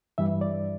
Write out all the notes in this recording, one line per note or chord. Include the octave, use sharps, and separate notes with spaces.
G2 E3 G3 E5
D5